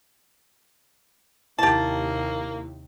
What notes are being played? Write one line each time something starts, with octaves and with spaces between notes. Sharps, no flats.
D#2 C3 A#3 E4 G4 A5